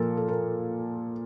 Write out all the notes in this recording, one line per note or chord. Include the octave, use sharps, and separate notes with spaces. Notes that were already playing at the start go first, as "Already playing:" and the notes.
Already playing: A#2 F3 A4 A#4
A4
A#4